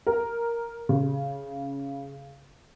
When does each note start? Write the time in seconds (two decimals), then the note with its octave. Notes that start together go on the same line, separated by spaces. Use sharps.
0.07 A#4
0.89 C#3